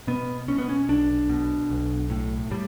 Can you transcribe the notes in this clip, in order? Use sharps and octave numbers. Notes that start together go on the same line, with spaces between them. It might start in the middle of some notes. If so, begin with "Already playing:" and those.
B2 B3
B2 C#4
B3
C#4
B1 D4
B2
B1
A2
A2 G3